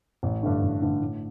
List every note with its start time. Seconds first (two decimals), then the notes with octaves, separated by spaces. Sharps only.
0.23 A1
0.43 G2 D3 A3 D4
0.62 A1
0.81 G2 D3 A3 D4
1.00 A2